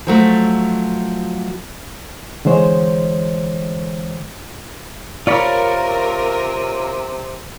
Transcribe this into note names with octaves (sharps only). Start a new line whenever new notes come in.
F3 F#3 A3
D3 E3 G#3 C5 C#5
C3 F4 A#4 C#5 D5 B5